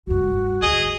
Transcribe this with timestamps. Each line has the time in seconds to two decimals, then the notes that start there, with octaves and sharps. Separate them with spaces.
0.07 F1 G2 F#4
0.62 D2 G#4 D#5